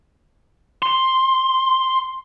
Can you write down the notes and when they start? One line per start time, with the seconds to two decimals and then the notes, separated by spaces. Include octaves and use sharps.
0.83 C6